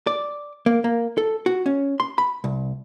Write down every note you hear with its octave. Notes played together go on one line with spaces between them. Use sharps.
D5
A#3
A#3
A4
F#4
C#4
C6
B5
C2